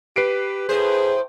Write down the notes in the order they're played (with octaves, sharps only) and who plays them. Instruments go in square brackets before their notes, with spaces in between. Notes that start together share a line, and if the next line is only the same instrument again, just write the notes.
[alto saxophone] G4 [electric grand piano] B4 C7 D7
[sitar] A2 C5 [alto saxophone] G#4